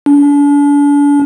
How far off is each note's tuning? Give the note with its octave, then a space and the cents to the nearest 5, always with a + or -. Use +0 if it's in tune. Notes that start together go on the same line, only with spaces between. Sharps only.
D4 -40